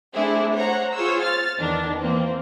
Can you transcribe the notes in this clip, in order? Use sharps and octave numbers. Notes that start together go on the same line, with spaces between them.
A3 C4 D4 E4 G#4
C5 C#5 F#5 A#5
F4 G#4 C5 C#5 E6
F6 A6
E2 D#3 E3 D4
E3 A#3 C4